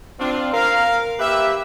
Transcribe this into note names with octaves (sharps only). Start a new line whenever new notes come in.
C4 D4 F4
A#4 F5
A#3 G4 B4 E5